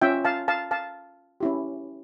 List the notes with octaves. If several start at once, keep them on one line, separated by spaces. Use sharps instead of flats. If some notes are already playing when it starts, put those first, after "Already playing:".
C#4 F4 E5 G5
F5 A5
F5 A5
F5 A5
C#4 E4 G4